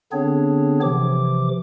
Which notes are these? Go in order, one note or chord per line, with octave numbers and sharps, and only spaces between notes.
D3 B3 C4 D4 G#4 C#5
C3 E3 F3 D6